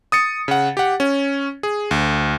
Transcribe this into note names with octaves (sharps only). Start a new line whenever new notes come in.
D#6 A6 C#7
C#3 F#5
G4 F#5
C#4
G#4
D2